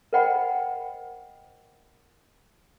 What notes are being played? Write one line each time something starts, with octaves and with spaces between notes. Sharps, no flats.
A#4 C5 D#5 F#5 G5 B5